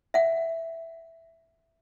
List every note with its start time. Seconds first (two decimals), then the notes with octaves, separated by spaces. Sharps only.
0.14 E5 F#5